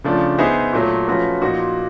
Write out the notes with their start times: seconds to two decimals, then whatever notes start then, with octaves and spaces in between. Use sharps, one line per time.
0.04 C#3 F3 A3 D4
0.38 B3 D#4 G#4 C5 E5
0.73 A#2 F#3 A3
1.07 F3 A3 C#4 F#4 B4
1.42 A#2 F3 A#3 D#4 F#4